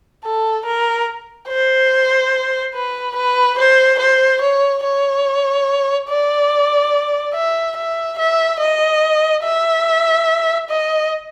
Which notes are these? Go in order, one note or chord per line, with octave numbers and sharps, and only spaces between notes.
A4
A#4
C5
B4
B4
C5
C5
C#5
C#5
D5
E5
E5
E5
D#5
E5
D#5